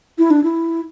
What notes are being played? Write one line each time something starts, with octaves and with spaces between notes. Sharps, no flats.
E4
D4
E4